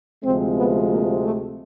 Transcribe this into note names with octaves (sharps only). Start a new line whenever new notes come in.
D2 C3 F3 G#3 C4
B3
A#3
A3